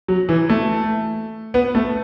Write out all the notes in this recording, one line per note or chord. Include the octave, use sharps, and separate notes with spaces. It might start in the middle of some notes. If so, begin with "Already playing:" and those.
F#3
E3
A3
B3
A3